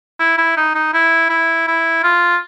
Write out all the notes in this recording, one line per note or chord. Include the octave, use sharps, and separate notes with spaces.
E4
E4
D#4
D#4
E4
E4
E4
F4